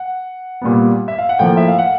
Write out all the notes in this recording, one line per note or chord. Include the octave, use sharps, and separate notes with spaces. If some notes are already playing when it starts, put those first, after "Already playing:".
Already playing: F#5
A#2 G3 B3
E5
F5
F#5
A2 F3 A#3 G5
E5
F5
F#5